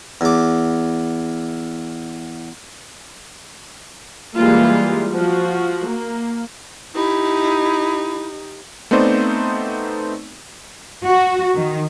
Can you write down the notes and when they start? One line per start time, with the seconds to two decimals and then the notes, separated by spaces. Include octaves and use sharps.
0.21 E2 D6
4.36 E3 G3 G#3 A#3 F4
5.13 F3 F#4
5.88 A#3
6.94 D#4 E4 G4
8.91 A3 B3 C4 D#4 C5 D5
11.04 F#4
11.54 D#3